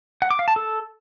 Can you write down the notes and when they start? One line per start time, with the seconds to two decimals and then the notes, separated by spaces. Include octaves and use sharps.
0.22 F#5
0.31 D6
0.39 F5
0.48 A5
0.56 A4